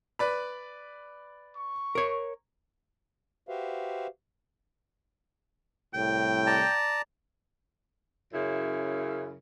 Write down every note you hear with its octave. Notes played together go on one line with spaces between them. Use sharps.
B4 D5 B5
C#6
A#4 C#5
F#4 G4 B4 C5 E5 F5
C2 A2 G5
D5 A5 A#5
F#2 C#3 E4